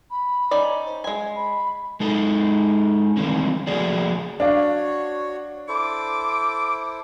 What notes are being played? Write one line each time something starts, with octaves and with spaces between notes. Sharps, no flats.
B5
C#4 D#4 D5
C5
G#3 G#5 C6
B5
G#3 D#4 A4
D#3 E3 G3 A3 C4 C#4
F3 A3 A#3 F#4 G#4 D5
D4 F#4 C#5 F5
E4 A4 C5 D6